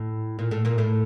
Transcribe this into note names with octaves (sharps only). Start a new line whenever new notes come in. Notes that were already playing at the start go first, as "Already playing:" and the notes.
Already playing: A2
A#2
A2 A3
A#2 A#3
A2 A3